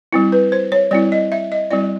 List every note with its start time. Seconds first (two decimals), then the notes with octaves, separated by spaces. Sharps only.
0.13 G3 C4 E4
0.32 B4
0.52 C5
0.72 C#5
0.91 G3 C4 E4 D5
1.12 D#5
1.32 E5
1.52 D#5
1.71 G3 C4 E4 D5